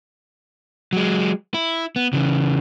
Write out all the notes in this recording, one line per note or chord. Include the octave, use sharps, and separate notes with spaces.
F#3 G#3
E4
B3
C#3 E3